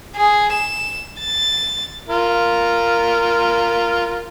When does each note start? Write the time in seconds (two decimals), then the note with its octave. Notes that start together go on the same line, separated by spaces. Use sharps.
0.16 G#4
0.53 E7
1.20 A6
2.08 F4 A#4